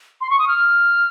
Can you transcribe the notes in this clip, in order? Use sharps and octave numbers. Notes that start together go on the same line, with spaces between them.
C6
C#6
D#6
F6